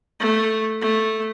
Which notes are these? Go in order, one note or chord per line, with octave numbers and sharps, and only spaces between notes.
A3
A3